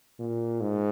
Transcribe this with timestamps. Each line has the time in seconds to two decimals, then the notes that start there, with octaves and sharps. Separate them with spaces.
0.19 A#2
0.61 G#2